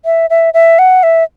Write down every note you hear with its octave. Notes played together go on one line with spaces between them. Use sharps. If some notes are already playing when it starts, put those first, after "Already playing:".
E5
E5
E5
F#5
E5